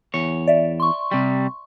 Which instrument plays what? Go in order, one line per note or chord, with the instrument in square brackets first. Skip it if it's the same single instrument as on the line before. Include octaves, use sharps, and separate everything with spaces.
[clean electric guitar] E2 C#5
[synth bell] D5 E5
C6 C#6
[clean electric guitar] C3 G3